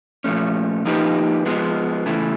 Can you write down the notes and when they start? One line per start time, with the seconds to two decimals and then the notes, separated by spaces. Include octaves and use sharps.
0.24 A#2 F3 A3 C#4
0.85 F3 A#3 D#4 G4 B4
1.46 F3 G#3 B3
2.06 C#3 E3 A3